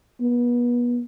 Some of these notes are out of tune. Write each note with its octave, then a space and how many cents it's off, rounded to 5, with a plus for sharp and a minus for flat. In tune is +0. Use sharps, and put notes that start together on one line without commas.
B3 -30